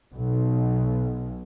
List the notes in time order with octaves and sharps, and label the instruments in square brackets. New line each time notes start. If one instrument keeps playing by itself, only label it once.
[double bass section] B1